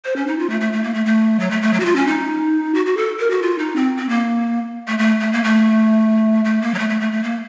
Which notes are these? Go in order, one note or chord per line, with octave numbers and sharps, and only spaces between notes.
C5
C#4
D#4
F4
A3
A3
A3
A#3
A3
A3
F#3
A3
A3
F#3
F#4
F4
C#4
D#4
F#4
F#4
A4
A#4
F#4
F4
D#4
C4
C4
A#3
A3
A3
A3
A#3
A3
A3
A#3
F#3
A3
A3
A3
A3
A#3